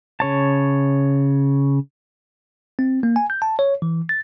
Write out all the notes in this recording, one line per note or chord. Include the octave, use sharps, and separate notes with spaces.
C#3 C#5 A5
C4
A#3
G#5
G6
A5
C#5
E3
A6